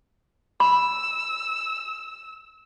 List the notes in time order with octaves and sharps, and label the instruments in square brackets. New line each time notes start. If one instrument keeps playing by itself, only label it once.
[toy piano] B5 [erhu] E6